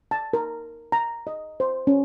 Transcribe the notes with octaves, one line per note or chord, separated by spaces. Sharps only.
A5
A#4
A#5
D#5
C5
C#4